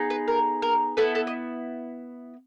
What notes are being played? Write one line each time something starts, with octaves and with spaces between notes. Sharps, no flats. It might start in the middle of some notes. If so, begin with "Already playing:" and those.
Already playing: B3 D#4 G#4
B4
A#4
A#4
B3 E4 A4 B4
A4
D#5